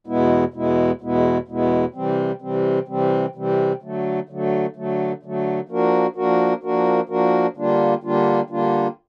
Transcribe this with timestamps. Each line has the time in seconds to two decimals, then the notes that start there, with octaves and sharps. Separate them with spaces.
0.07 E2 B2 G#3 B3 E4
0.54 E2 B2 G#3 B3 E4
1.01 E2 B2 G#3 B3 E4
1.48 E2 B2 G#3 B3 E4
1.94 C3 E3 G3 C4
2.42 C3 E3 G3 C4
2.88 C3 E3 G3 C4
3.35 C3 E3 G3 C4
3.82 D3 F#3 A3
4.29 D3 F#3 A3
4.76 D3 F#3 A3
5.23 D3 F#3 A3
5.69 F3 A#3 D4 F#4 A#4
6.16 F3 A#3 D4 F#4 A#4
6.63 F3 A#3 D4 F#4 A#4
7.09 F3 A#3 D4 F#4 A#4
7.57 D3 G3 A#3 D4 F4
8.03 D3 G3 A#3 D4 F4
8.50 D3 G3 A#3 D4 F4